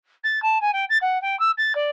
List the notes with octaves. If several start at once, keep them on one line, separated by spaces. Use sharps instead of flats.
A6
A5
G#5
G5
A6
F#5
G5
E6
A6
D5